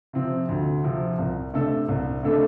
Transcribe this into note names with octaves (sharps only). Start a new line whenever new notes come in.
C3 F3 C4
D2
C3 F3 C4
C2
C3 A3 D4 A4
C2
C3 A3 D4 A4